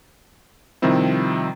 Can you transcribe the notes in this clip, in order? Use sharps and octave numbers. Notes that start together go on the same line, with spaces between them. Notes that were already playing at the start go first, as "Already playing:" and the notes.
C3 D#3 F3 G3 C4 E4